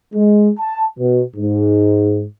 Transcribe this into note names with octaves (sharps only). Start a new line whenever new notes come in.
G#3
A5
B2
G#2